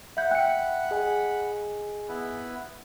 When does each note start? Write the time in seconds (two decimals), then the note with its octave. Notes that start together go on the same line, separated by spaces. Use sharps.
0.17 E5 F#5 B5 G6
0.31 E5 G5 F#6 C#7
0.91 G#4 D#5 G#5
2.09 B3 E4 B4